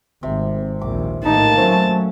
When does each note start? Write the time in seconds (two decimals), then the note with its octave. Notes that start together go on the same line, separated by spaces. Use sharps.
0.23 G#1 C3
0.82 A#1 D#2 D6
1.25 A2 D#3 A#3 D#4 A5
1.58 F#3 A3 C4 C#4